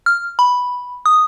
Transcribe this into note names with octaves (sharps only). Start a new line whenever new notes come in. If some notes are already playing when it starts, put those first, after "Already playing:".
F6
B5
D#6